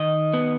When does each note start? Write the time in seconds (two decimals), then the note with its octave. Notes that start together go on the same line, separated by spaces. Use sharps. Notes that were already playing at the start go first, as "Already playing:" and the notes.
Already playing: D#3 D#5
0.34 B3